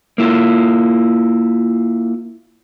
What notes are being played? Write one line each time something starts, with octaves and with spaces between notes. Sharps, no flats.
A#3 E4 F4